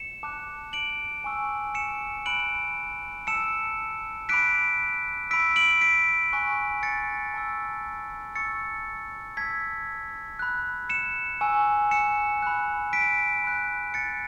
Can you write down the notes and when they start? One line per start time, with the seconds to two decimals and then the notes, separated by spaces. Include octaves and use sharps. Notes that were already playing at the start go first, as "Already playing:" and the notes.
Already playing: C#7 E7
0.23 A5 D6 F#6
0.73 D7 F#7
1.24 G#5 C#6 E6
1.75 C#7 E7
2.26 B5 F#6 D7 F#7
3.27 A5 E6 C#7 E7
4.29 B5 D6 F#6 B6 D7
5.31 B5 E6 B6 D7
5.56 D7 F#7
5.81 B6 D7
6.33 G#5 C#6 F#6
6.83 A6 C#7
7.34 A5 C#6 E6
8.35 A5 C#6 E6 A6 C#7
9.37 A5 E6 G#6 B6
10.39 B5 F#6
10.89 C#7 E7
11.41 G#5 C#6 E6
11.91 C#7 E7
12.42 B5 F#6
12.93 B6 D7
13.44 B5 F#6
13.94 A6 C#7